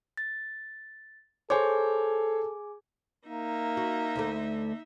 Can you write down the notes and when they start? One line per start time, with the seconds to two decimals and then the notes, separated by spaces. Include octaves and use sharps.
0.17 A6
1.50 G#4 A4 C5 C#5 G#5 D6
3.28 A#3 D#4 E5
3.77 F#4
4.16 D2 D3 A3